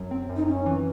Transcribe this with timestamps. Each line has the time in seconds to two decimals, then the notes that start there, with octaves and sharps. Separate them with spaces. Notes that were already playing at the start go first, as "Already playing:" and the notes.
Already playing: F#2 F#3
0.11 C4
0.29 F#2
0.37 D#4
0.47 F#2 C#4
0.66 E3